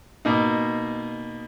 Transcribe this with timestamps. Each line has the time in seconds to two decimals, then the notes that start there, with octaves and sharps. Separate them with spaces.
0.25 B2 A#3 D#4